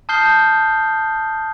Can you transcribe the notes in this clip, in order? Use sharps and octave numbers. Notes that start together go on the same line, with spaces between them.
A5 D#6 F6 G6 C7 G7